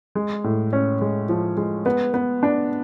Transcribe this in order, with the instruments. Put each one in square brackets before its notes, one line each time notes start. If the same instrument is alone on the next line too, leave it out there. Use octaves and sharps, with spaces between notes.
[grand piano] G#3
A2
C#4
G#3
F3
G#3
B3
B3
D4